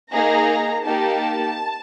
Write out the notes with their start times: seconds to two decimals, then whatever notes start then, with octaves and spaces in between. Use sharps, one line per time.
0.11 A#3 D#4 G#4 A#5
0.84 A#3 D#4 G4 A5